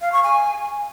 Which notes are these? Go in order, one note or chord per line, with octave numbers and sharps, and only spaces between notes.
F5
C#6
G#5